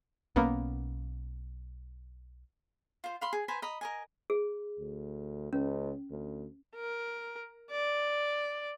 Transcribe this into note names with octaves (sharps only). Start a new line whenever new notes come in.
B1 A#3 B3 C#4
F4 C5
F5 B5 C6
G#4
B4 C5 G#5 A#5
D#5 A#5 B5
A#4 D#5 G#5
G#4
D2
C#2 C#4
D2
A#4
D5